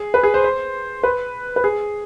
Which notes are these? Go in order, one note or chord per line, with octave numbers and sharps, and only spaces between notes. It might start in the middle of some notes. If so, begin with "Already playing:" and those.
Already playing: G#4
B4
G#4
C5
C5
B4
B4
G#4